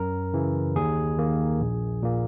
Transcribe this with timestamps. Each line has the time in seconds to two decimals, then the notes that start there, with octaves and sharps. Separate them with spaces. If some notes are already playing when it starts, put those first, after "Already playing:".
Already playing: F#2 A#4
0.33 C#3 E3
0.76 D#2 G#4
1.18 D#3 A#3
1.60 A#1
2.03 A#2 A#3